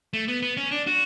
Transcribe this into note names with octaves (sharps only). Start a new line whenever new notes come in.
A3
B3
B3
C#4
D4
F#4